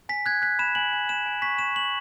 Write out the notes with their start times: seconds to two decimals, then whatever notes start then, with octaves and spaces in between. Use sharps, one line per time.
0.09 G#5 B6
0.26 F#6 G#6
0.42 F#6 B6
0.59 B5 E7
0.75 G#5 F#7
0.93 G#5
1.09 G#5 E7
1.26 G#5
1.42 C#6 B6
1.58 C#6 E7
1.75 C#6 F#7